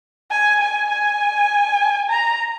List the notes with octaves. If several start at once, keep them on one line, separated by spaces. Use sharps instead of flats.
G#5
G#5
G#5
A#5